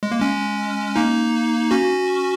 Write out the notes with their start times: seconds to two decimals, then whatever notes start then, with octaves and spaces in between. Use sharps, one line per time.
0.03 G#3
0.12 A#3
0.20 G#3 C#4
0.96 A#3 D#4
1.71 C#4 F#4